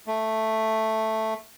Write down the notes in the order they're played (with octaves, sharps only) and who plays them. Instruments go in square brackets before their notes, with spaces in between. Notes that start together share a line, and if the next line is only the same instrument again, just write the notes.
[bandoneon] A3